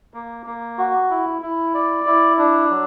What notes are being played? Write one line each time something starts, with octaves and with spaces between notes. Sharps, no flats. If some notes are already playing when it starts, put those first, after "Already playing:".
A#3
A#3
F#4
E4
E4
D5
E4
D4
F#3